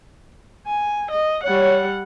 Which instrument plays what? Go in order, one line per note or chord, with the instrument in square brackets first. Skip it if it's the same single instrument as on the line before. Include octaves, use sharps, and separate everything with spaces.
[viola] G#5
D#5
[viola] G3 F#5 [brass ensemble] C#5